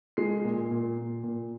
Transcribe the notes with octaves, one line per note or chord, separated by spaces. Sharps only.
G#3 C7
A#2
A#2
A#2
A#2